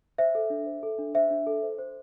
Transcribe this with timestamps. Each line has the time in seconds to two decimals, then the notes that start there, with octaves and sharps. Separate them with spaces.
0.18 C5 E5
0.35 A4
0.50 D4
0.66 C5
0.83 A4
0.99 D4
1.15 C5 E5
1.31 D4
1.47 A4
1.63 C5
1.79 C5